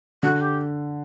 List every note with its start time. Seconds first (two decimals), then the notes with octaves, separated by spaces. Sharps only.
0.23 D3 F#4
0.40 G4